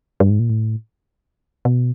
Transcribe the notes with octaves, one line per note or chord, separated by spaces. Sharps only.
G2
G#2
A#2
A2
B2